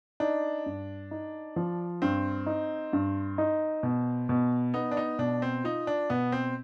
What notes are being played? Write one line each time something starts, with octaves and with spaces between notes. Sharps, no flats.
D4 D#4
G2
D#4
F3
G2 C4
D#4
G2
D#4
B2
B2
B3 D#4
D4
D#4
B2 D4
C4
D#4 F4
D4
B2 B3
C4